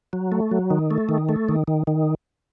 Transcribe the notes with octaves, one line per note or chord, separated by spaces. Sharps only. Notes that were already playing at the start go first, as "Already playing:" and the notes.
F#3
A3
F#3
D#3
A3
D#3
A3
D#3
D#3
D#3